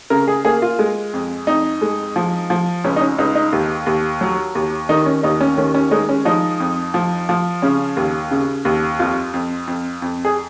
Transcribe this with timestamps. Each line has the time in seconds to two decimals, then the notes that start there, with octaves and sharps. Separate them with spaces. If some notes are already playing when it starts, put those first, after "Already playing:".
0.10 C#3 A#4
0.28 G#4
0.45 A#3 G#4
0.62 F4
0.79 G#3
1.13 F2
1.47 F2 D#4
1.82 G#3
2.16 F3
2.50 F3
2.84 C#2 C#4
2.96 D#4
3.01 C#4
3.18 C#2 D#4
3.35 D#4
3.52 D#2
3.86 D#2
4.21 F#3
4.55 D#2
4.89 D#3 D#4
5.06 C#4
5.23 D#2 D#4
5.41 C#4
5.58 D#3 C#4
5.74 C#4
5.91 G#3 D#4
6.09 C#4
6.25 F3 D#4
6.60 F2
6.94 F3
7.29 F3
7.62 C#3 C#4
7.97 D#2
8.31 C#3
8.65 D#2
8.99 F2 F4
9.34 F2
9.67 F2
10.02 F2
10.25 G#4